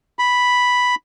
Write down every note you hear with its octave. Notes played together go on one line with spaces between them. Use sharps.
B5